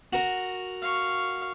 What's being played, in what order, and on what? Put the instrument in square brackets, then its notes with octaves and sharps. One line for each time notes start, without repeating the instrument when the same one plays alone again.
[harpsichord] F#4 A#4
[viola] F5 C#6